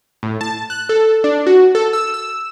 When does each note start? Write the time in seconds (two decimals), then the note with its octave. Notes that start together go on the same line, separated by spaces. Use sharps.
0.23 A2
0.41 A5
0.70 F#6
0.89 A4
1.24 D4
1.47 F#4
1.75 A4
1.93 E6
2.14 E6